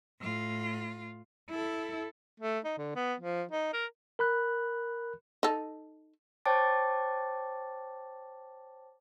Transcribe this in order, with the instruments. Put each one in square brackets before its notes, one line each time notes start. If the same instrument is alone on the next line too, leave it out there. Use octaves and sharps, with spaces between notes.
[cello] A2 F4
E4 A4
[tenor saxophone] A3
D#4
D3
B3
F3
D#4
A#4
[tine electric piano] A#4 B5 F#6
[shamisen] D#4 A4
[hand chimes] C5 C#5 G5 A5 D6 A6